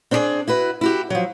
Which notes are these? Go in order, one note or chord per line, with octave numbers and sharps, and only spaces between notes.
C4 D4 E4 F4 G#4 D5
E4 F#4 B4
E4 F#4 G4
F3 F#3